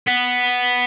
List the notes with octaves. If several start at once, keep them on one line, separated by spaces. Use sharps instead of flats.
B3